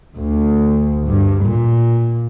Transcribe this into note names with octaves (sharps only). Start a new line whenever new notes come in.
D2
G2
A#2